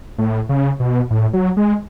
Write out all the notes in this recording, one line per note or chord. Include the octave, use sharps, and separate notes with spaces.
A2
C#3
B2
A2
F#3
G#3